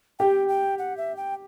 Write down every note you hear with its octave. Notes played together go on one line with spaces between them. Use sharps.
G4 G5
G5
F#5
E5
G5